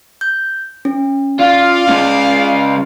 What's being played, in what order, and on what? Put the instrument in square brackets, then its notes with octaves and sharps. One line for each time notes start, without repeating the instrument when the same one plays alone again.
[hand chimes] G6
C#4
[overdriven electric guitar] F4 [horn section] D5 F5
[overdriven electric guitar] C#3 G#3